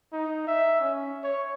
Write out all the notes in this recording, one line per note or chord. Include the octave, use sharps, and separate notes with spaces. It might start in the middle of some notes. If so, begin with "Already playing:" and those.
D#4
E5
C#4
C#5